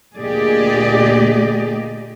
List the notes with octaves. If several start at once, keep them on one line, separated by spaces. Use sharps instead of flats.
D2 A#2 G4 G#4 D5 D#5